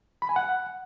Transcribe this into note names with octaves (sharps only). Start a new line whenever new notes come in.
B5
G#5
F#5